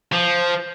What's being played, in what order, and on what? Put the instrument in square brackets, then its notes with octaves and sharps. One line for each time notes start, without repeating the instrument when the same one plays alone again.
[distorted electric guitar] F3